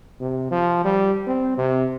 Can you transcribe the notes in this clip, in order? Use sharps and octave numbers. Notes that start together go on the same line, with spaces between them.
C3
F3
G3
C4
C3